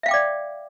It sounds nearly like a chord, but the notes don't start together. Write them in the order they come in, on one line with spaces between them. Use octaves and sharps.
E5 F5 G5 D6 D5